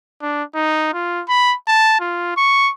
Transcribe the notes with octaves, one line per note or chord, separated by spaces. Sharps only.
D4
D#4
F4
B5
A5
F4
C#6